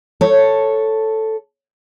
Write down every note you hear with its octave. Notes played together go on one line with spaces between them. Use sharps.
A4 C#5